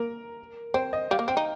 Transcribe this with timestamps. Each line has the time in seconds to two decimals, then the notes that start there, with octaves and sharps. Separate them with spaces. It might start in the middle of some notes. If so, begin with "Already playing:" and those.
Already playing: A#3 A#4
0.74 C4 C5
0.93 D#5
1.11 G3 F5
1.19 A#3
1.28 C4 G5
1.37 D#4